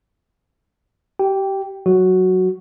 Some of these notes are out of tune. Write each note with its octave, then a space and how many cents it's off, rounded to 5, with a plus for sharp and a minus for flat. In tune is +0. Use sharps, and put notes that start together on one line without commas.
G4 -25 G5 +0
F#3 +0 F#4 +0